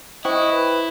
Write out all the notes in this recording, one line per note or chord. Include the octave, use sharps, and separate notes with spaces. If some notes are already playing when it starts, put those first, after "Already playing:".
E4 C5 D#5 G5 C#6
B4